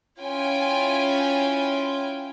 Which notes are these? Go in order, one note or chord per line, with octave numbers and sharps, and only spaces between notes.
C#4 E4 F4 G5 G#5